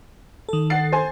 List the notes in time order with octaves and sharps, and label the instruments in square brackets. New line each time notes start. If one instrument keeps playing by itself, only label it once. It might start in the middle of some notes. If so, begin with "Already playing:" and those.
[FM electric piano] D#3 A4
[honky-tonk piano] F#5 A6 C7
C5 G#5